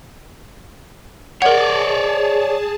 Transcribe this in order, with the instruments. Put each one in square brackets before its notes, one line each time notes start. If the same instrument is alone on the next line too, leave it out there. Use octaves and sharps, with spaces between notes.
[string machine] G#4 A5 [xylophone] A#4 F#5 [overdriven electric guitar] C#5 D5